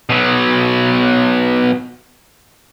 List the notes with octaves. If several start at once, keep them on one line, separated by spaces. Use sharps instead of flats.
B2 F#3